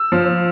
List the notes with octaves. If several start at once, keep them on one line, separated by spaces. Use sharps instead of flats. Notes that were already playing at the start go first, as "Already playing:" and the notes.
Already playing: E6
F3